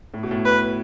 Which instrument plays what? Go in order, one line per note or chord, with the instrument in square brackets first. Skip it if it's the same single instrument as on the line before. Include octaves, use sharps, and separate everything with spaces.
[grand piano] A2
B2
A2
[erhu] B4